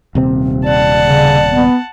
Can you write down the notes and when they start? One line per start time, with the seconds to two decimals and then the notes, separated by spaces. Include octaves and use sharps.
0.15 D#1 C3 C4
0.65 D5 F#5 A5
1.00 C#3
1.51 B3